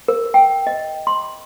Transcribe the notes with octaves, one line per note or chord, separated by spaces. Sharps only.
A#4
G5
D#5
C6